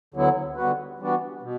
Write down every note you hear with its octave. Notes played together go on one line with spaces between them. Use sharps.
D2 D3 F#3 B3 E4
D3 G3 B3 F#4 B4
E3 G3 B3 D4 F#4
B2